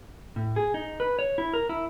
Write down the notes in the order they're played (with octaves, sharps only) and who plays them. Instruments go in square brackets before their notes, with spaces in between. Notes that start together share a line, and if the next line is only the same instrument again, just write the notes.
[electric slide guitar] A2
G#4
D#4
B4
C#5
E4
A#4
E4